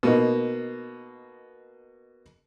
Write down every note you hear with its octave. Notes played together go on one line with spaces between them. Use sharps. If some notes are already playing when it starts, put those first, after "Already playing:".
B2 A#3 D#4